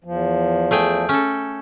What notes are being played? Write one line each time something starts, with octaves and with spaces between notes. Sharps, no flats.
E2 F3
A3 G#4 G5
C#4 A4